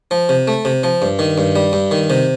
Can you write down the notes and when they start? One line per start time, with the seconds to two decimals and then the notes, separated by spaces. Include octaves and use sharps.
0.11 F3
0.29 C3
0.48 A3
0.65 C3
0.83 F3
1.02 G2
1.19 D#3
1.38 G2
1.56 G3
1.73 G2
1.91 D#3
2.10 C3